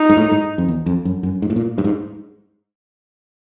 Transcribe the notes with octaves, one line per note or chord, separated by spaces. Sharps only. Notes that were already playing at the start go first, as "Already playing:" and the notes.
Already playing: D#4
G#2
A2
G#2
F2
E2
F2
F#2
F#2
G#2
A2
A#2
G2
G#2